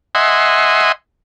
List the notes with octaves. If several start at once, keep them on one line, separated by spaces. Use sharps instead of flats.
D#5 E5 F#5 G#5 C6